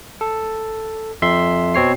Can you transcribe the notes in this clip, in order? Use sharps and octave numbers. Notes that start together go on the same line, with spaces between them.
A4
F2 E5 C6
B2 C4 C#5 C7